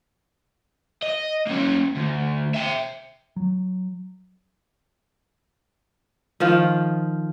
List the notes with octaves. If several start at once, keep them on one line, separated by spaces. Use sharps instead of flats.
D#5
A#3 C#4
D2
E5 G5
F#3
D#3 F3 F4